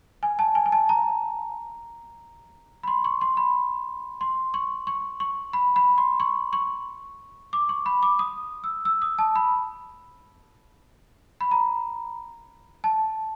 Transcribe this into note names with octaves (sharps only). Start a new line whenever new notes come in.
G#5
A5
G#5
G#5
A5
A#5
B5
C6
C#6
C6
B5
C6
C#6
C#6
C#6
B5
B5
C6
C#6
C#6
D6
C#6
B5
D6
D#6
E6
E6
D#6
A5
B5
B5
A#5
A5